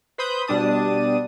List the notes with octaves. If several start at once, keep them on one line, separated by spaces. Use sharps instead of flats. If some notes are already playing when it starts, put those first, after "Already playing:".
B4 C5 B5 D#6 G6
B2 G3 D4 A5 D#6